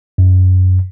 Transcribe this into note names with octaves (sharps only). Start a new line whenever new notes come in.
F#2